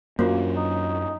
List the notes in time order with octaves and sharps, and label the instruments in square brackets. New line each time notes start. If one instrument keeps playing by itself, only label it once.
[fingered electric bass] F#2 C#4 D4 [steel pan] A#3 [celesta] F4 F#4 C5
[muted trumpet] D#4